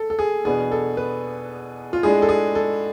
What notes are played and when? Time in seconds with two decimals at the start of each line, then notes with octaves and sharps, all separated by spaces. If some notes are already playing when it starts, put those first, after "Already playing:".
Already playing: A4
0.10 A4
0.19 G#4
0.45 E2 B2 B3 D4 G#4
0.72 A4
0.97 B4
1.93 F4
2.03 A2 G#3 D4 G#4
2.22 A4
2.29 G#4
2.55 A4